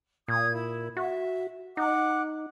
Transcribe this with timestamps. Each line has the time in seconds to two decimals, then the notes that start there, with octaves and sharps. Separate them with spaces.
0.28 A#2 D#6 G#6
0.53 E4
0.97 F#4 E5
1.77 D#4 F#5 D6 F#6